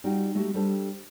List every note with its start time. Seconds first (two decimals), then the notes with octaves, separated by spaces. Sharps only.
0.04 G3 D#4 F4 F#4 F#5 G5
0.35 G#3 A3 D#4 F#4 G4
0.54 G3 D4 G4 A4 C5 A5